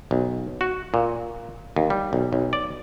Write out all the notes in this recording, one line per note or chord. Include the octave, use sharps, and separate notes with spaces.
B1
F#4
A#2
D#2
G3
B1
B1
D5